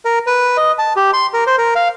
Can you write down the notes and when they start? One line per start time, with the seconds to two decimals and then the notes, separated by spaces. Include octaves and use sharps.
0.05 A#4
0.27 B4
0.57 D#5
0.79 A5
0.96 G4
1.13 C6
1.34 A#4
1.47 C5
1.58 A#4
1.76 F5